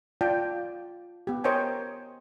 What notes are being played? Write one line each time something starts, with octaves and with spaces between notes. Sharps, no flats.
F4 D5 G5 A5
B3 G4
A#4 C5 C#5 D#5 G5 G#5